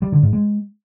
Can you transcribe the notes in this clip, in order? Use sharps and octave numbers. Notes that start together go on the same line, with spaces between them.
G3
D3
G#2
G#3